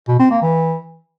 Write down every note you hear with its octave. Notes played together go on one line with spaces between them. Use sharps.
B2
C4
A#3
E3